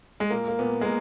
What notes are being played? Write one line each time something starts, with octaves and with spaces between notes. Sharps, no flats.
G#3
A#2 A#3
A#3
A#2 B3
G#3
A#2 A#3